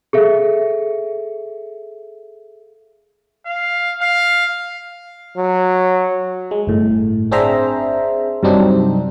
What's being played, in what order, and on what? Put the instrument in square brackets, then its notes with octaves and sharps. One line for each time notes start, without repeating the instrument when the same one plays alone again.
[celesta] G#4 A4 E5 F5
[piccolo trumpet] F5
F5
[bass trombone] F#3
[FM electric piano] G#3
G1 A2
C4 D4 G#4 C5 E5 A#5
G2 C3 F#3 C4 D4 D#4